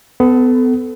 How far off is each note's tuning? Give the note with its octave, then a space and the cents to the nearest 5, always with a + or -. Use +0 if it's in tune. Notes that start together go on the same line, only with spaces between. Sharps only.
B3 +30 A4 +0